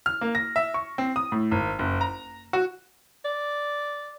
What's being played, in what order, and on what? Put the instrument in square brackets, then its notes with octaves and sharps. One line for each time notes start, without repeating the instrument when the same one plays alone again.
[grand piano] F6
A#3
A#6
E5
C#6
C4
D#6
A2
G#1
F#1
A#5
F#4
[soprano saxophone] D5